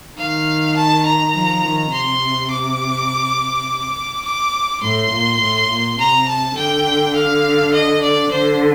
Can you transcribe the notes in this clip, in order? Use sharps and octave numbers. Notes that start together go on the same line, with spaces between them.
D#3 F5
A5
A#5
F3
D#3
C3 C6
D6
D6
A2 C6
A#2
A2
A#2
C3 A#5
A5
D3 G5
F5
D#5
D5
D3 C5